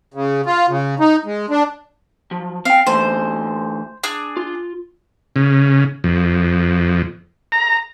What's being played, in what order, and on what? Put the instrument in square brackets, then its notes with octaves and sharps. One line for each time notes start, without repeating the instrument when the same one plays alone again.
[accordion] C#3
F4
C#3
D#4
G#3
D4
[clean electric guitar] F3 F#3
[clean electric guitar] C4 G5 [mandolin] F5
[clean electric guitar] D3 E3 A3 [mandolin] C5
[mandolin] D4 G#4
[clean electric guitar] F4
[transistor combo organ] C#3
F2
A#5